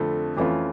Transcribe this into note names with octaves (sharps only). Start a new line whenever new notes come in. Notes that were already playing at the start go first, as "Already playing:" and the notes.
Already playing: F2 D3 A3
F2 E3 A3 C#4 F4